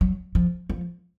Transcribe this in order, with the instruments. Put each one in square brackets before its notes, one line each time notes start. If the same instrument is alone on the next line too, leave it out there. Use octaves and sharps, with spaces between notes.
[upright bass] F#3
F3
F3